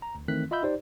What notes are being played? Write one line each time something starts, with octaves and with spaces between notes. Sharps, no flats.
A#5
D2
D#3 E3 A3 C4 F#6 B6
F4 D#5 E5 B5 E6 G6
D#4 G4 C5 D5